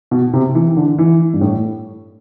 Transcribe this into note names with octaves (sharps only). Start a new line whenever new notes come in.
B2
C3
E3
D3
E3
G2
A2